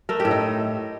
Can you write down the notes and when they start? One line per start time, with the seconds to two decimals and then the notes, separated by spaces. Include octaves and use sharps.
0.09 A3 A#4
0.20 G4
0.25 A2
0.31 D#4